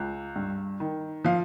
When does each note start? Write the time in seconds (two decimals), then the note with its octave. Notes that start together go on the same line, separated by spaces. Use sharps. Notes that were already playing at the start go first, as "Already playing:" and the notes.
Already playing: C#2
0.36 G2
0.80 D#3
1.25 F3 F5